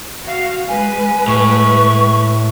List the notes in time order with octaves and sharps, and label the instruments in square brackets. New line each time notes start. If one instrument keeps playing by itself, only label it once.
[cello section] F#4 F5
[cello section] G#3 B4 [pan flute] G#5
[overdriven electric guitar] A2 [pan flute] C#6